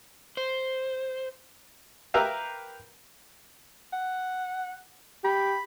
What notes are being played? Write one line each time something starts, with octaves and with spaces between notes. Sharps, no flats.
C5
G4 A#4 B4 E5 F5
F#5
G4 B5